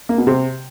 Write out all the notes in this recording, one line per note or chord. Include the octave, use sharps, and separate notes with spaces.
A#3
B2
C3